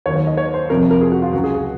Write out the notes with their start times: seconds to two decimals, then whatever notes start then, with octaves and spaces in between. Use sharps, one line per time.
0.06 D#2 D#3 F#3 C#5
0.16 C#5
0.27 D#5
0.37 C#5
0.54 C5
0.70 F2 C3 F3 A#4
0.91 A#4
1.01 G#4
1.12 F#4
1.22 F4
1.33 C#2 C#3 F#3 F#4
1.44 G#4
1.54 G#4